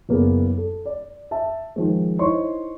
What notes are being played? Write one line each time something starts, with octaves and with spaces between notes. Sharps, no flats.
F#1 A#3 B3 G#4
A4
D5
E5 A5
D#3 F3 G#3
D#4 E4 C5 C#5 C6 C#6